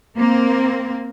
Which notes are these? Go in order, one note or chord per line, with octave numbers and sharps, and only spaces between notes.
A#3 C4